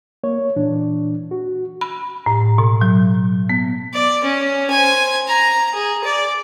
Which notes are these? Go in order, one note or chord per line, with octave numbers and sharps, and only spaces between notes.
A#3 C#5
A#2 E3 D4
F#4
B5
A2
B2
F#3
B3
D5
C#4
C5 G#5
A#5
G#4
D5